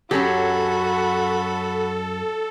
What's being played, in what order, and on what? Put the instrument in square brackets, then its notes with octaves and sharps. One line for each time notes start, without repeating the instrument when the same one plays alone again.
[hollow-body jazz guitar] F#2 G4 [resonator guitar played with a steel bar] F#3 C#4 [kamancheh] F#4 B5 [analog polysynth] A4